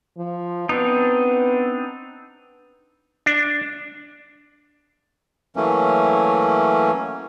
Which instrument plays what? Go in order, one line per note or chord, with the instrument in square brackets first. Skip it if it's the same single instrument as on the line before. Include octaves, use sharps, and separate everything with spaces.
[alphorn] F3
[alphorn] B3 [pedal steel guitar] C4 D4 D#4
[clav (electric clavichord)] D4
[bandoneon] E3 F#3 A3 A#3 C#4